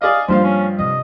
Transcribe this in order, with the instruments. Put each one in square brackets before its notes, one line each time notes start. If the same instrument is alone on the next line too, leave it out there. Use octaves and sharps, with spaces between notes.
[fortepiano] G#4 D5 D#5 [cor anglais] F5
[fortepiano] G2 F3 F5 [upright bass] A#3 [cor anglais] C5
[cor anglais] C#4
[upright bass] C3 [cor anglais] D#5